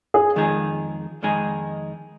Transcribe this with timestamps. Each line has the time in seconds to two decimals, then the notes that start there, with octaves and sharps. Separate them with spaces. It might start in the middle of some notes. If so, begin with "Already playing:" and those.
0.14 G#4
0.36 F2 D#3 G#3 D#4 G#4
1.23 F2 D#3 G#3 D#4 G#4